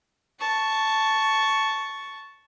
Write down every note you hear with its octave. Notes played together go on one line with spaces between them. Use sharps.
A5 C#6